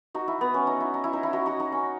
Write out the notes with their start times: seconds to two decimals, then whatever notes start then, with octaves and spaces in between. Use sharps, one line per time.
0.15 D#4 F#4
0.28 E4
0.41 B3
0.54 C#4
0.67 D#4
0.81 E4
0.94 D#4
1.04 E4
1.13 D#4
1.23 E4
1.33 D#4 F#4
1.46 D#4 F#4
1.60 D#4
1.72 C#4